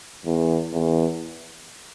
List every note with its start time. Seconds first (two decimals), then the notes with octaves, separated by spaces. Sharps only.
0.26 E2
0.73 E2